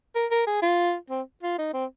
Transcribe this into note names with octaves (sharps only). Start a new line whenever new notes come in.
A#4
A#4
G#4
F4
C4
F4
D#4
C4